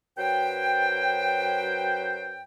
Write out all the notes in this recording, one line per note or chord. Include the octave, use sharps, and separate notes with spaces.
F#2 F#3 B4 C5 G5